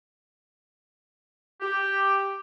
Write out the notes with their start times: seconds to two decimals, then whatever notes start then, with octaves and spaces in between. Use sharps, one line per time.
1.61 G4